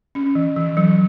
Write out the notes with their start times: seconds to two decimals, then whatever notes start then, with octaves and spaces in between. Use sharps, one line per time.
0.15 C#4
0.35 E3
0.56 E3
0.77 F#3